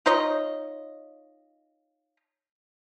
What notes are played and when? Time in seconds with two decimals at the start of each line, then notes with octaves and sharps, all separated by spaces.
0.06 D#4 F4 C#5 D#5